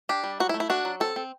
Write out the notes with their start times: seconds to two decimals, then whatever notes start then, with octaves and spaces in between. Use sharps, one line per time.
0.09 D4 G4
0.23 G3
0.40 F#3 F#4
0.49 E4
0.54 A3
0.60 E4
0.70 D4 F#4
0.85 F#3
1.00 C4 A4
1.16 C4